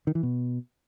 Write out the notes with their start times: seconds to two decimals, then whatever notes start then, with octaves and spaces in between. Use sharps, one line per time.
0.07 D#3
0.15 E3
0.23 B2